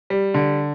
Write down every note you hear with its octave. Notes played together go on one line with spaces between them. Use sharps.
G3
D3